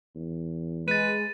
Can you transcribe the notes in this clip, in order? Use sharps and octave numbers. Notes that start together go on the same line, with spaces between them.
E2
G#3 B4 A6 D#7